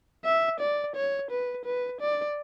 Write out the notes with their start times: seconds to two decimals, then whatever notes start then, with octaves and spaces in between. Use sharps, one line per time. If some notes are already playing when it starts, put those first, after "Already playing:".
0.25 E5
0.60 D5
0.95 C#5
1.31 B4
1.65 B4
2.00 D5